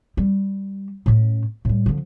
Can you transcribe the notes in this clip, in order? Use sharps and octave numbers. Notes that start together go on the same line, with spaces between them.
G3
A2 C#4
A2 G3
D3 F3